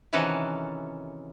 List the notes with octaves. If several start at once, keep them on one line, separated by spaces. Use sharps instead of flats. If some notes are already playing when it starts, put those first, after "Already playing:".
C3 D#3 E3 C#4 F#4 A4